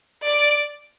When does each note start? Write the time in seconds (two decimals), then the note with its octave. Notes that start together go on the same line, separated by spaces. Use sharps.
0.23 D5